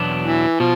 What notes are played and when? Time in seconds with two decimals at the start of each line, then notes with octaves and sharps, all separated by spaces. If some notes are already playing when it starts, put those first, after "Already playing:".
Already playing: E2 B2 F#3 B3 D4
0.22 E3
0.60 B2 F3